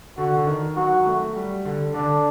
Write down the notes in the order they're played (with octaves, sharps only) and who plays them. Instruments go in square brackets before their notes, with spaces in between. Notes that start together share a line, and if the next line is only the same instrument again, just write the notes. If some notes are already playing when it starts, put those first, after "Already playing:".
[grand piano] D3 [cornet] F#4
[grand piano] D3
D#3
[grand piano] F#3 [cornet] F#4
[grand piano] A3
G3
D3
[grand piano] D3 [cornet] D4